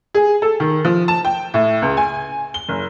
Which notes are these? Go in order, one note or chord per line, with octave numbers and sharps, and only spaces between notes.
G#4
A4
D#3
F3
A5
G5
A2
C#2
G#5
G7
F#1